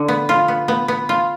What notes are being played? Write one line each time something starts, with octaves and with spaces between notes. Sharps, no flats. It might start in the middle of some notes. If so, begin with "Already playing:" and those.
Already playing: D3
B3
F4
B3
B3
B3
F4